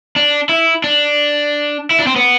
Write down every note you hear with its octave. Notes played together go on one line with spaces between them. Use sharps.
D4
E4
D4
E4
D4
C4
B3